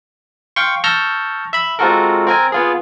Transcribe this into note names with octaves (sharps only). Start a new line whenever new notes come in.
F5 G5 C6 C#6
A5 C#6 E6 F6 G6 A#6
E5 B5
G#3 C4 F4 F#4 A4 A#4
C4 A#4 G#5
B3 F4 G#4